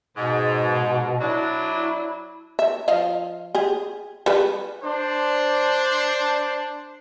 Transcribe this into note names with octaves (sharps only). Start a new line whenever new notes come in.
G#2 B2
F#3 D4 E4
E5
F3 D#5 F5
G4 G#4
G3 G#4 B4
D4 C5